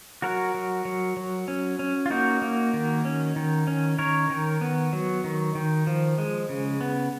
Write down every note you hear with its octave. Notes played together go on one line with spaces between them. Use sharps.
F#3 F#4 A#4
F#3
F#3
F#3
C#4
C#4
F4
A#3 D#4 F#4
A#3
D#3
C#4
D#3
C#4
D#3 A#4 C#5
D#3
B3
F#3
D#3
D#3
F3
G#3
C#3
B3